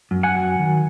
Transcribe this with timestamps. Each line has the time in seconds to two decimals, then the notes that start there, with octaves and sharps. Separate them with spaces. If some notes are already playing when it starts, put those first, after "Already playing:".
0.11 F#2
0.23 F#5 G#5
0.36 F#3
0.59 D#3